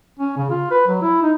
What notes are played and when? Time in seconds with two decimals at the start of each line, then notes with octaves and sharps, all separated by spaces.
0.20 C#4
0.37 C#3
0.51 F4
0.71 B4
0.88 F#3
1.02 E4
1.23 D#4